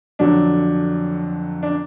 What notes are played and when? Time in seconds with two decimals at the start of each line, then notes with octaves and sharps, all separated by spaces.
0.19 F2 D3 F#3 D4
1.63 D4